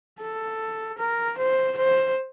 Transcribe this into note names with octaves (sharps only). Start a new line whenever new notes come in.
A4
A#4
C5
C5